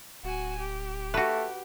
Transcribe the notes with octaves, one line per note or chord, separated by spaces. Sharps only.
D1 F#4 G#5
G4
A3 F#4 B4